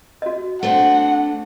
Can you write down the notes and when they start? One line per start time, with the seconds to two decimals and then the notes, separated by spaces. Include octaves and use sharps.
0.22 F#4 D#5
0.63 A3 C4 D4 F#5